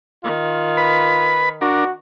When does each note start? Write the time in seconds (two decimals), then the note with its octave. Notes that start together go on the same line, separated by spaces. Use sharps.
0.24 D#3 F4
0.77 B4 B5
1.61 D4 F#4 A#4